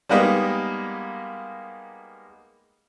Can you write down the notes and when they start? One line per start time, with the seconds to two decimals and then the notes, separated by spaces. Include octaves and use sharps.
0.09 G3 G#3 A#3 B3 D#4